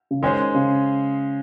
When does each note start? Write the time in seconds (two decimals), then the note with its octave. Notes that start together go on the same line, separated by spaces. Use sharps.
0.11 C#3
0.22 D#3 G#3 C#4 G#4 C5
0.54 C#3